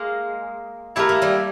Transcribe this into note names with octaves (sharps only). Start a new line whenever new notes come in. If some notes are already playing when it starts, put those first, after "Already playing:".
Already playing: G#3 A#3
A3 E4 G4 A#4
A#3
G3 A3